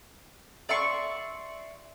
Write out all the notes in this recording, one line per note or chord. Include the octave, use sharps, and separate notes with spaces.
D5 E5 C6 C#6